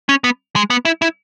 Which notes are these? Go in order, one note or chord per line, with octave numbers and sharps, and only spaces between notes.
C#4
B3
G#3
B3
E4
E4